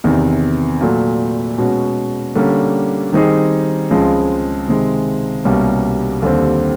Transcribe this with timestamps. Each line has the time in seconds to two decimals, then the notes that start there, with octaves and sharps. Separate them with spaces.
0.04 E2 C3 D#3
0.81 A#2 F#3 A3
1.58 B2 G#3 C#4 F#4
2.35 D3 G3 A#3 C#4
3.13 D#3 G3 C4 D#4 G#4
3.90 C#2 C#3 F3 G#3 C4
4.68 C3 D#3 G#3 C4
5.44 C2 B2 G3 A#3 C#4
6.22 D#2 D3 G3 C4